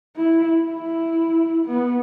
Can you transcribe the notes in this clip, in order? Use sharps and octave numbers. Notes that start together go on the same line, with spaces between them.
E4
E4
B3